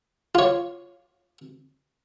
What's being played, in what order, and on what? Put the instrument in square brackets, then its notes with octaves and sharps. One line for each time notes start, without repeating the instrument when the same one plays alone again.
[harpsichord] F4 C#5